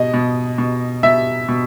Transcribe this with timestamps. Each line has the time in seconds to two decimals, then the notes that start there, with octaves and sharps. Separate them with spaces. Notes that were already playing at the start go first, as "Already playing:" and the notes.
Already playing: B2 D#5
0.14 B2
0.58 B2
1.03 B2 E5
1.48 B2